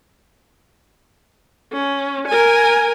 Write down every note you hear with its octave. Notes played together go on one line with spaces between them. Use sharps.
C#4
A#4 G#5